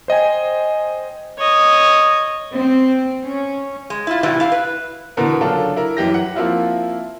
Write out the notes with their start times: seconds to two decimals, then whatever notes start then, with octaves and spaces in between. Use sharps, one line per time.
0.08 C5 D#5 G5 G#5
1.38 C#5 D#5
2.55 C4
3.24 C#4
3.90 G#3
4.07 E4 F4
4.23 A2 C3 E3 G3 E4 F#4
4.40 E4 F5
4.52 B4
5.17 B2 D3 E3 A#4
5.41 C#3 F#3 D4 F4 A4 A#4
5.76 E4 A#4
5.97 F#2 E3 G4 A#6
6.14 F#5
6.35 F3 A#3 C4 E4 F4